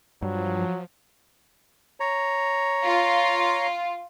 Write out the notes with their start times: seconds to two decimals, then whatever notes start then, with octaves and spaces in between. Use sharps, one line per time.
0.22 G2 F3 F#3
2.00 C#5 A#5
2.84 F4